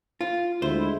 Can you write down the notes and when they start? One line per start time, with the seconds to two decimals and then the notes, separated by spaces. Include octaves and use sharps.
0.21 F4
0.62 D2 G#3 E4 C5